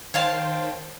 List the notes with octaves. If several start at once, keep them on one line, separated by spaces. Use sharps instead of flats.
D#3 C5 C#5 F5 G5 A5